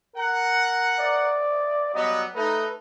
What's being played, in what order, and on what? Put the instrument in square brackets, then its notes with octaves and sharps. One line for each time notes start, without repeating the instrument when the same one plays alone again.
[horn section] A#4 F#5
[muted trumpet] D5
[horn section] F#3 G3 B3 [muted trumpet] D#5
[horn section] A3 D#4 [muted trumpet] B4